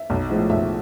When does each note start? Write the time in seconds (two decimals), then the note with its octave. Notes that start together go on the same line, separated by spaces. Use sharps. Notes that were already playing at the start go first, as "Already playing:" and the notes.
Already playing: E5
0.10 B1
0.30 A2 F3 G#3
0.50 B1 E5